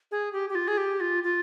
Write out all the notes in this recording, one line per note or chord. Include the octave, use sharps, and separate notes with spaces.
G#4
G4
G4
F4
G#4
G4
F4
F4